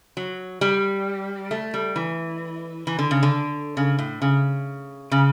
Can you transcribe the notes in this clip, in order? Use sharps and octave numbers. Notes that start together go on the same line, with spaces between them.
F#3
G3
A3
G3
E3
E3
D3
C#3
D3
C#3
A2
C#3
C#3